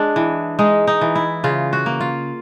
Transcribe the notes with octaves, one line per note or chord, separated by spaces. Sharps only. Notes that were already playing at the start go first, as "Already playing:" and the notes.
Already playing: G#3 D4
E3
G#3 D#4
D#4
E3
E4
C#3 F4
F#4
A#3
F4